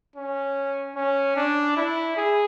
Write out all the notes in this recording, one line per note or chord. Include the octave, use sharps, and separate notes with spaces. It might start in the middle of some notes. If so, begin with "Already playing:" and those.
C#4
C#4
D4
E4
G#4